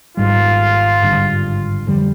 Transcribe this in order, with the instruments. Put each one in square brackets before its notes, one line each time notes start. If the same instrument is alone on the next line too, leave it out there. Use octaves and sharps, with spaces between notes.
[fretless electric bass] G#1 G#2 G3 [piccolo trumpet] F4
[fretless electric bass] G#1 G2 D3
F2 D3 G3